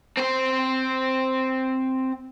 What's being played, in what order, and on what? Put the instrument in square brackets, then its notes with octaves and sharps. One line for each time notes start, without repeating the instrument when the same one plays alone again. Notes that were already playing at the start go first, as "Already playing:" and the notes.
[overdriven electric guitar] C4 C5